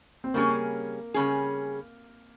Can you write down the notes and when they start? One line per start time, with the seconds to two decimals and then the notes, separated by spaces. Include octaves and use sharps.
0.24 C4
0.34 C#3 G3 A#3 C#4 G#4
1.14 C#3 G3 C#4 G#4